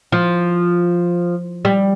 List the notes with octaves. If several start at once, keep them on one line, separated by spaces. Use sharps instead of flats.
F3
G3